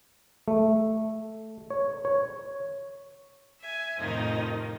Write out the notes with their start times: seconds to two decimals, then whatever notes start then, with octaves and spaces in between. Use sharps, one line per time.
0.48 A3
1.70 C#5
2.05 C#5
3.60 E5 G#5
3.98 F2 A2 C3 D#3 F3 D#4